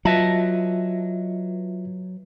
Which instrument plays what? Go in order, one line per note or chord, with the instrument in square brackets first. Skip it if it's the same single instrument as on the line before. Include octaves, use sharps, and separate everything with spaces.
[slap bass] F#3 [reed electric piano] F4 E5 [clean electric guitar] B4 D#5 A5